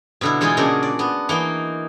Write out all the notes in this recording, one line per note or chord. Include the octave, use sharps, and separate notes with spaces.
B2 D3 E4
E3 G#3 D#4 F4 G#4
A#2 C#3 D4 F#4 A#4
D5
B3
E3 A#3 D#4